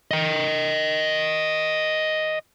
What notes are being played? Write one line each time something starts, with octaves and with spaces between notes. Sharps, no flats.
D#5 G5